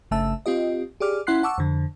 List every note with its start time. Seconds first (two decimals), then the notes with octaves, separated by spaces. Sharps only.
0.11 G1 C#3 A3 E5 A5 E6
0.46 C4 F4 G4 D#5
1.00 G4 G#4 D5 D6 F6
1.27 C#4 E4 F#5 C6 F#6 C7
1.43 F#5 A5 C#6 D6 E6
1.58 F2 D3